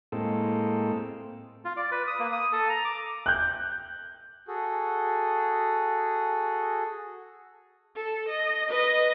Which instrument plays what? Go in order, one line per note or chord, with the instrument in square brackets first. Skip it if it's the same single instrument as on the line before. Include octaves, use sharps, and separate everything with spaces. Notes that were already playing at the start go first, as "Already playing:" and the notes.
[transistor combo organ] A2 G#3 A#3 C4 A4
[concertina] F4
D5
B4
D#6
A#3
D#6
A4
A#5
D6
[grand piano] F#6 G6
[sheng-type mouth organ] F#4 G#4 A4
[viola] A4
D#5
B4 D#5